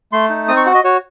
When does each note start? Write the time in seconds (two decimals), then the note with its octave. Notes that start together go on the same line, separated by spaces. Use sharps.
0.12 A3 C6
0.29 D#4
0.48 C4 D#6
0.57 C#6
0.66 F#4 F#5
0.75 D#5
0.84 F#4 C#5